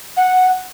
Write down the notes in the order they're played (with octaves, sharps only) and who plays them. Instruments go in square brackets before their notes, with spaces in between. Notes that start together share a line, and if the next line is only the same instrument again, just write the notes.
[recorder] F#5